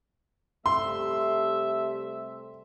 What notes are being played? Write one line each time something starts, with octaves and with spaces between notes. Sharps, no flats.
C3 G3 A3 E5 C6